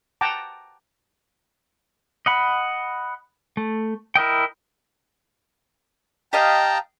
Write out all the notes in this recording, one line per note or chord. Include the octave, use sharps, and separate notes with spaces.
F#5 G5 A5 A#5 D6
D#5 F#5 B5
A3
E4 A#4 D#5 G5
G4 D#5 F5 G5 A5 A#5